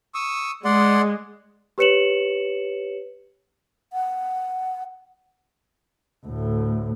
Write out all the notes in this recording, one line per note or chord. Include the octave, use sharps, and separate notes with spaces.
C#6 D#6 E6
G#3 D5 F#5 C6
G4 B4 C#5 C#7 E7 F#7
F#5
D2 A2